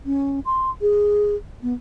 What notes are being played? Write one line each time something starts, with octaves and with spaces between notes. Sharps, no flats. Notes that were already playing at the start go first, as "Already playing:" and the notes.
C#4
C6
G#4
B3